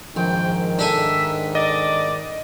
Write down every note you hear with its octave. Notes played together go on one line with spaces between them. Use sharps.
A#1 G#2 D#3 G5
D4 A4 E5 G#5
D5 D#5